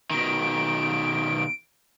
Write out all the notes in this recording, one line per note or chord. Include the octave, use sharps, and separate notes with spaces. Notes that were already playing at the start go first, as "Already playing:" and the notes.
B2 D#3 D7